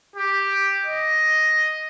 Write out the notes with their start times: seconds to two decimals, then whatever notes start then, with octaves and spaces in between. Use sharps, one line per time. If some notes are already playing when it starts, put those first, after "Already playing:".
0.16 G4
0.85 D#5